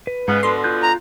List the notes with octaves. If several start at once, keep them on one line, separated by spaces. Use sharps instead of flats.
B4
G#2 C#3 B3
B2 D3 C6
F4 F#6 G6
A#5